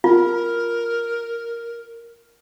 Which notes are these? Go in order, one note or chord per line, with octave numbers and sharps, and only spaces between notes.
F4 A#4